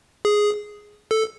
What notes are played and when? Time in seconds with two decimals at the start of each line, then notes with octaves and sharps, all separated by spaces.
0.25 G#4
1.11 A4